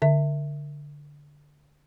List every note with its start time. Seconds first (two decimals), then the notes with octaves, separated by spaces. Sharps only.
0.02 D3 E5